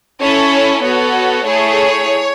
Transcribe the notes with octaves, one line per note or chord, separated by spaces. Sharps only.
C#4 E4 A4 C#5
B3 F#4 A4 C#5
A3 E4 G#4 C#5